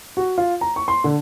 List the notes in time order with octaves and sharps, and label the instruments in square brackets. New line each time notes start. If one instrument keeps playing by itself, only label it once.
[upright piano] F#4
F4
A#5
C#6
C6
D3